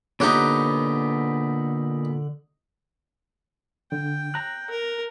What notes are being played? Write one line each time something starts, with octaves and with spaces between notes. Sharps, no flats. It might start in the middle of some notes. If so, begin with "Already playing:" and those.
A#2 D3 B3 D#4 G4 C#5 F#6
D3 G5
A#5 F#6
A#4